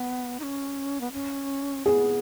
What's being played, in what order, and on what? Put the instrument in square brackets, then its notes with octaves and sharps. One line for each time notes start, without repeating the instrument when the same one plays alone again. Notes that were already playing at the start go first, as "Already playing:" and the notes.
Already playing: [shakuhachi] B3
D#4
C#4
B3
C#4
[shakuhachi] C#4 [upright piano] G#4
[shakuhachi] B3